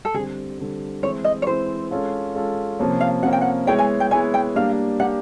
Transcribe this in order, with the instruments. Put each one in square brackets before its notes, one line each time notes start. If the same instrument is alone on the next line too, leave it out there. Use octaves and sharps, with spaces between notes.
[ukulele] A4
[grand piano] D3 G3 C4 [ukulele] G#4
[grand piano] D3 G3 C4
[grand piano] E3 G#3 C4 E4 [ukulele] C#5
[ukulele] D#5
C#5
[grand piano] E3 G#3 C4 E4 [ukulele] C5
[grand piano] G#3 C#4 F4 A4
G#3 C#4 F4 A4
C3 F3 A#3 C#4
[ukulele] F5
[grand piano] C3 F3 A#3 C#4 [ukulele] F#5
[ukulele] G5
F#5
[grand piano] G#3 B3 E4 G#4 C#5 [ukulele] G5
[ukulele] G#5
G5
[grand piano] G#3 B3 E4 G#4 C#5 [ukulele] G#5
[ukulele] G5
[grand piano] G3 A#3 D4 G4 [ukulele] F5
[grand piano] G3 A#3 D4 G4 [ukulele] F#5